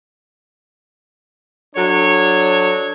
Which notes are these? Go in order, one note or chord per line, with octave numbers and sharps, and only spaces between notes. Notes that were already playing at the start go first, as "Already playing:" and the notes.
F#3 D4 A4 C#5